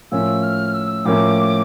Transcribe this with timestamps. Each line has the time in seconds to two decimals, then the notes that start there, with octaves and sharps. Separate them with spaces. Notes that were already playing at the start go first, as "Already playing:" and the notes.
0.12 A2 F3 A#3 C#4 E6
0.43 F6
0.74 E6
1.05 A2 F3 A#3 C#4 D6